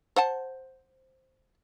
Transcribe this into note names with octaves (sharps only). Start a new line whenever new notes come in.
C5 F#5 A5